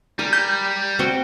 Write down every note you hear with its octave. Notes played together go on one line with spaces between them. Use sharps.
G3 A#4 G#5
G6
C4 F#4 G5